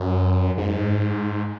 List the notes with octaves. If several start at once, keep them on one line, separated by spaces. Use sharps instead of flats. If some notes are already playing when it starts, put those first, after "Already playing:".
Already playing: F#2
G#2